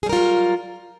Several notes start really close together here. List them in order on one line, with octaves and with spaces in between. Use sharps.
G#4 G3 A#4 F4 F#3